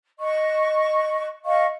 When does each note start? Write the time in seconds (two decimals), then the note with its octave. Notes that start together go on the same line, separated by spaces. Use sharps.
0.19 D#5 C#6
1.44 D#5 F5 C#6